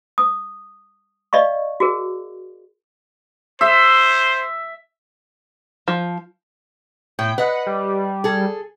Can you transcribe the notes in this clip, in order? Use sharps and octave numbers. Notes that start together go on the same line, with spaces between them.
D#6
D5 D#5 F5 C#6
F#4 G#4 A#4
C5 E5
F3
A2 G5
B4 D#5 F#5
G3
G#4 A4